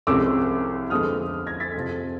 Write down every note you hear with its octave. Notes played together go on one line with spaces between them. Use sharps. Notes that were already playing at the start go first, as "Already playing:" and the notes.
C2 C3 F3 G#3 C#4 D6 E6
F2 D3 F3 G#3 B3 D#6 F6
G#6 A#6
A6 B6
F2 C3 F3